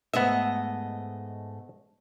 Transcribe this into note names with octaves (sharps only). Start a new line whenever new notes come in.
G#2 A3 B3 D#5 E5